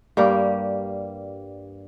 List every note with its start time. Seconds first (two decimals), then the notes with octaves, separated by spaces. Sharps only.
0.17 G2 G3 A#3 G4